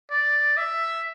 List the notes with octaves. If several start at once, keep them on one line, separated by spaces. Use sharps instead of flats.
D5
E5